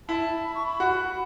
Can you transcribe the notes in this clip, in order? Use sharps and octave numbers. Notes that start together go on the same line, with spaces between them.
E4 A5
B5
C#6
B5
F#4